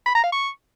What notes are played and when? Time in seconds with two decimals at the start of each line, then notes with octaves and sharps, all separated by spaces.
0.06 B5
0.15 A#5
0.24 F5
0.32 C#6